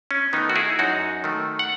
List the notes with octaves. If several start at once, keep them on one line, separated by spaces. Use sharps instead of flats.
C#4
D#3 A3 B3 D#4
F#4
E4 G#4
F#2 D#4 F#4
D#3 A3
F#5